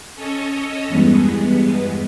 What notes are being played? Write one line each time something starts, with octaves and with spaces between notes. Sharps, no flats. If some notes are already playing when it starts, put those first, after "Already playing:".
C#4 A4 C#5 D#5
E2 G2 G#3 B3